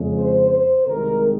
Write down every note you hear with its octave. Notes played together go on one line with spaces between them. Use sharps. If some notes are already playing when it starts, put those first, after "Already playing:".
Already playing: F2 C#3 G#3
C5
C5
C2 C3 D#3 G#3 A#4